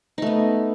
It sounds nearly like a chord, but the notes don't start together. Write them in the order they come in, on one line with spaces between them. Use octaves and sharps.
D#4 A3 B3